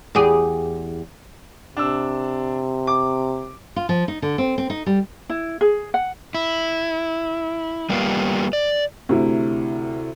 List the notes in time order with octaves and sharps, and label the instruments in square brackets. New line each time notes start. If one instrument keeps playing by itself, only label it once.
[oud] E2 G4 G#4
[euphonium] C3 [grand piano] D4 E6
[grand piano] D6
[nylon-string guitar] F4
F3
D#4
D3
C4
C4
D#4
G3
[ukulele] E4
G#4
F#5
[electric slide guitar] E4
G3 A#3 B3 F4 G4
D5
[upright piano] D2 C3 E4